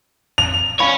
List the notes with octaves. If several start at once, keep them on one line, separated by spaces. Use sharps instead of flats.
F7
C#4 C#5 F5 B5